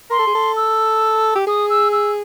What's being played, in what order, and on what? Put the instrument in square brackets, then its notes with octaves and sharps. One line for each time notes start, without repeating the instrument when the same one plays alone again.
[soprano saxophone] A#4 [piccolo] C6
[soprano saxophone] A4
G#4
A4
[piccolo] E6
[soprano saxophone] G4
[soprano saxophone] G#4 [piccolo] D#6
[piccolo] E6
E6